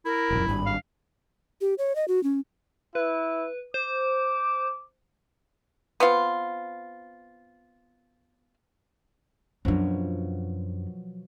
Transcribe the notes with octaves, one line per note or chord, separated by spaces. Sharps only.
E4 A#4
E1 A#1 F#2
G#1 G2 B5
F5
G4
C#5
D#5
F#4
C#4
E4 B4
C5 D6
B3 C4 F4
F#2 B2 F3 F#3 D4